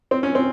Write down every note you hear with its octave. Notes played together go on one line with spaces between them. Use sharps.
C4
C#4
C4